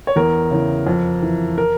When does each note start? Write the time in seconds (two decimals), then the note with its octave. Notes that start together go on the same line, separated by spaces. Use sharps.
0.07 C#5
0.16 E2 A#4
0.51 C#3 E3
0.87 F2
1.22 E3
1.58 A#4